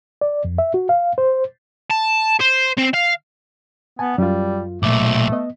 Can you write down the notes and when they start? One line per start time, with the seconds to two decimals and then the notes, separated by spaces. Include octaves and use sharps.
0.21 D5
0.45 F2
0.58 E5
0.74 F#4
0.89 F5
1.18 C5
1.91 A5
2.40 C5
2.78 C4
2.93 F5
3.99 B3 G#5 A5
4.18 F#2 G3 F4
4.83 B1 A#2 A3 D6
5.32 B3 D#5